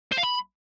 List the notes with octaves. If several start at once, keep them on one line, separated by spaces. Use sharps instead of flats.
C5
F5
B5